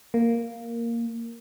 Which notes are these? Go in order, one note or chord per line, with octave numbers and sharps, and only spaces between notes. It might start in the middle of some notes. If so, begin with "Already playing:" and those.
A#3